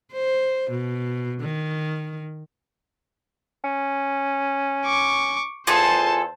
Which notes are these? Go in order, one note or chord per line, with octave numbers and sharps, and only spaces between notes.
C5
B2
D#3
C#4
C#6 D6
E2 F4 G#4 A4 C5 A5